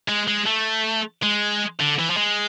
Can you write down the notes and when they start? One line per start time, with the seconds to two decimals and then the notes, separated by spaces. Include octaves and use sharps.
0.08 G#3
0.28 G#3
0.46 A3
1.23 G#3
1.80 D3
1.99 E3
2.10 F3
2.17 G#3